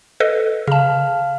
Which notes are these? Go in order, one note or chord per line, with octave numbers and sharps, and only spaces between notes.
A4 B4 D#5
C#3 F5 A5 F6